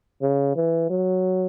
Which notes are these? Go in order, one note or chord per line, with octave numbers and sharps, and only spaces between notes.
C#3
E3
F#3